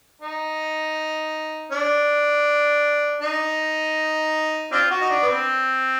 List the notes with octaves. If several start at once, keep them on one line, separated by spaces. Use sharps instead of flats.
D#4
D4
D#4
C4 D4 F4
F#4
D#4
D4
B3
C4